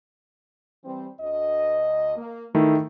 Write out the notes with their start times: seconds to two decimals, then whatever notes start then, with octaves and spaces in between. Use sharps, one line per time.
0.85 E3 G3 C4
1.20 D2 D#5
2.16 A#3
2.55 A#2 D#3 E3 A3 E4